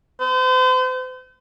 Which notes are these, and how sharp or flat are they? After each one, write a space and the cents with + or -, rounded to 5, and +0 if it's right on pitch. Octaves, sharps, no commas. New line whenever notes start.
C5 -40